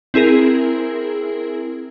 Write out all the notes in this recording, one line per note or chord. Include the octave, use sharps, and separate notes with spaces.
C4 E4 G#4 A#4